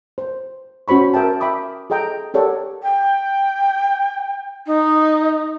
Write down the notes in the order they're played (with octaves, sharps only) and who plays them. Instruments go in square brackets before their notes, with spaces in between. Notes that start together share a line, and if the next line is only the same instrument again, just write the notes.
[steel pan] C5
C#4 F#4 C5 B5 C#6
A#4 E5 G5 A5
E5 G5 B5 D6 D#6
G#4 A4 D#5 G5 A#5
G4 A4 A#4 C#5 D5 F#5
[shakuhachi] G5
D#4